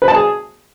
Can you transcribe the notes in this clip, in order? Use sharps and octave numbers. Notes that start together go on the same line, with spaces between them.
B4
A5
G#4